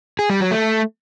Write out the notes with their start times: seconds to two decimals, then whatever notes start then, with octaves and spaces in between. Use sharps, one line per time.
0.19 G#4
0.30 G3
0.40 F#3
0.51 A3